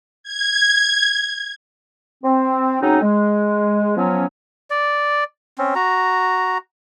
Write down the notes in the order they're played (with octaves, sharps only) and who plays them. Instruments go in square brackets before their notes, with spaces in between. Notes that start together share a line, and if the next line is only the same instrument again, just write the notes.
[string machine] G#6
[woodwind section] C4
C#3 F#3 C4 C#4 D#4
G#3
F3 F#3 B3 C#4
[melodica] D5
C4 C#4
F#4 A#5